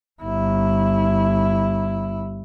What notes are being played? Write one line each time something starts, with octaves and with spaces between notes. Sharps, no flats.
G1 E4